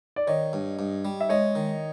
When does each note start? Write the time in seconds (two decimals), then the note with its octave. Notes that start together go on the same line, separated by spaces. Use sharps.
0.16 D5
0.27 D#3 C#5 D#5
0.53 G2
0.79 G2
1.05 G3
1.21 E5
1.29 G#3 C#5 D#5
1.55 D#3